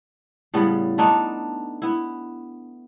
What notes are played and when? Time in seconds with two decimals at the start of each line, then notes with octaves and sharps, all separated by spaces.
0.54 A2 C#3 G3 B3
0.98 A3 B3 D4 D#4
1.82 B3 E4